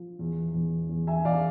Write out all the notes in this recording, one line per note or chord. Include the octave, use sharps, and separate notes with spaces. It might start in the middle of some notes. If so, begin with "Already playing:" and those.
Already playing: F3
E2
E2
E2
E5 G#5
E2 D5 F5